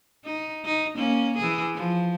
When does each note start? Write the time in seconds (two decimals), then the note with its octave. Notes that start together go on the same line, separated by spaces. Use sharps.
0.25 D#4
0.65 D#4
0.96 A#3 C#4
1.37 E3 G#4
1.75 F3